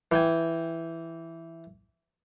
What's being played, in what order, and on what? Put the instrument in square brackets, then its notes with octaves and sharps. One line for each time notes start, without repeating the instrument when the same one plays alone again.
[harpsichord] E3 G5 G#5